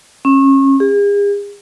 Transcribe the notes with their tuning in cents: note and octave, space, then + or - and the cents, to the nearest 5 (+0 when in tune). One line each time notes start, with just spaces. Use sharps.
C#4 -30
G#4 -40